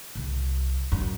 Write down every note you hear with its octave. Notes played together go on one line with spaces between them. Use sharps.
C2
F#2